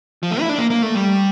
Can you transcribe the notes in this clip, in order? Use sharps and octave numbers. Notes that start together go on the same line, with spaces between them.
F3
A3
E4
D4
A#3
A#3
A3
G3